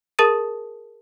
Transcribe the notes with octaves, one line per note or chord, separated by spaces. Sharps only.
G#4 A#4 A5 D#6 A6 D#7